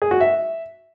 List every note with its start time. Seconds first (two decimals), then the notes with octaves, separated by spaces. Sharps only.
0.02 G#4
0.11 F#4
0.21 E5